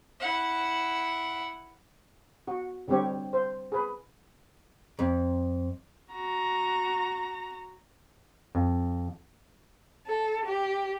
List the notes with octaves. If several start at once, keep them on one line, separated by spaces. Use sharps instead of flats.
E4 F#5
F#4
D3 G3 C4 G4 C#5
C5
G#4 B4
F2
F#4 A#5
F2
A4
G4